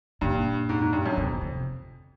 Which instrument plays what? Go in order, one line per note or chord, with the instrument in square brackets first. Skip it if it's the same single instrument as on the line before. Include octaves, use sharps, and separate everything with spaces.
[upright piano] G2 [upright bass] A#2
[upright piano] G#2
G#2
G2
F#2
[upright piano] F2 [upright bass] B2
[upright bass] C3